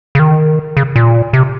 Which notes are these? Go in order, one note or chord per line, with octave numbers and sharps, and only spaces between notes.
C#3
D#3
C#3
A#2
C3